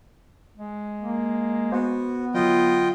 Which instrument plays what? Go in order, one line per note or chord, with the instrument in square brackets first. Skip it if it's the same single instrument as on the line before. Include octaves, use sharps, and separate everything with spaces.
[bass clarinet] G#3
[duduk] A#3
[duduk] B3 [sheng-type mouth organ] F#4 [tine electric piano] C5
[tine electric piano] D3 F#3 [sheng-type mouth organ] F4 D#5 G5